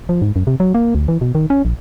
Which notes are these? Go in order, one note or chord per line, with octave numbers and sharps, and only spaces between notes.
F3
G#2
F#2
C3
F#3
A#3
D2
E3
B2
D#3
C#4
A#1